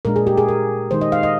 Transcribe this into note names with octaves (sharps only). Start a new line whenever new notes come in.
A#2 G#3 D4 A#4
G#4
G4
G#4
A#4
D#3 G#3 D#4 C5
D#5
F5
D#5